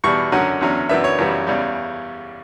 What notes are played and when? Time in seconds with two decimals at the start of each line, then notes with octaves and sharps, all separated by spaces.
0.04 E2 B2 G3 C#6
0.32 F#2 D3 F#3 C#4 F#5
0.61 E2 D3 F#3 C#4
0.89 F#2 E3 B3 D4 E5
1.04 C#5
1.18 F#2 C#3 E3 G3 B3
1.47 E2 C#3 G3